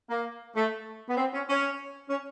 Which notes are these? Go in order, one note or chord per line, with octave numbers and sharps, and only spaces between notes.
A#3
A3
B3
C4
C#4
C#4
C#4